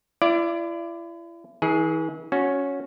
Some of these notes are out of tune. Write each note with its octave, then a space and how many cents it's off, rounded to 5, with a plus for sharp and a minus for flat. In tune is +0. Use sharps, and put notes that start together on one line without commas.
E4 +40 D5 +0
E3 -45 G#4 +10
C#4 +5 F#4 -15